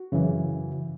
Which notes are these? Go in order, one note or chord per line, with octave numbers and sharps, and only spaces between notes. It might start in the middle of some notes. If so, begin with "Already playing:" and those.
Already playing: F#4
F#2 C#3 E3